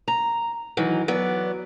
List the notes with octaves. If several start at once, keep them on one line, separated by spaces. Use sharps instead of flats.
A#5
D#3 E3 F#3
F#3 B3 D5